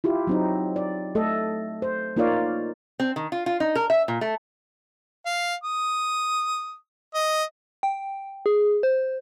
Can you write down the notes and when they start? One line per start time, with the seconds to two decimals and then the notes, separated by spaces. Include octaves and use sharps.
0.04 E4 F4 G4
0.27 F#3 C4 D#4
0.76 D5
1.15 A3 A4 D#5
1.82 C5
2.16 A#3 D#4 F4 C#5 D5 F5
3.00 C4
3.16 D#3
3.32 F4
3.46 F4
3.60 D#4
3.75 A#4
3.90 E5
4.08 A#2
4.21 A3
5.26 F5
5.64 D#6
7.15 D#5
7.83 G5
8.46 G#4
8.83 C5